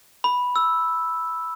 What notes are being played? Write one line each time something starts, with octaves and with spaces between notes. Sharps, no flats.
B5
E6